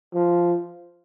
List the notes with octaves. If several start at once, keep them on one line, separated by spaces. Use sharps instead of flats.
F3